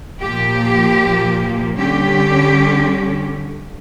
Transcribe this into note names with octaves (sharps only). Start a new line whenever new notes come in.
A#2 F3 A#3 G4
D3 G3 C#4 G4